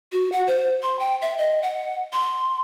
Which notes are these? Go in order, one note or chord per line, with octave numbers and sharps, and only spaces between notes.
F#4
F#5
C5
C6
G5
E5
D#5
F#5
C6